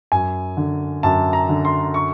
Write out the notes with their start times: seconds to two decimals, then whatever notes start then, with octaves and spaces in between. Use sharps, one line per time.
0.12 F#2 G#5
0.57 D3
1.03 F#2 A5
1.33 A#5
1.49 D3
1.65 C6
1.94 C#6